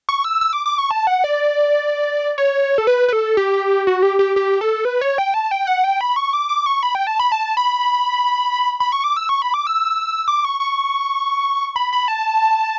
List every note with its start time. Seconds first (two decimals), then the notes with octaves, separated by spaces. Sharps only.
0.09 C#6
0.25 E6
0.41 E6
0.53 D6
0.66 D6
0.78 C#6
0.91 A5
1.07 F#5
1.24 D5
2.38 C#5
2.78 A4
2.87 B4
3.09 B4
3.13 A4
3.37 G4
3.87 F#4
4.03 G4
4.19 G4
4.36 G4
4.61 A4
4.85 B4
5.01 C#5
5.18 G5
5.34 A5
5.51 G5
5.67 F#5
5.84 G5
6.01 B5
6.16 C#6
6.33 D6
6.49 D6
6.66 C#6
6.83 B5
6.95 G5
7.07 A5
7.20 B5
7.32 A5
7.57 B5
8.80 B5
8.92 C#6
9.04 D6
9.17 E6
9.29 C#6
9.42 B5
9.54 D6
9.67 E6
10.28 D6
10.45 C#6
10.60 C#6
11.76 B5
11.93 B5
12.08 A5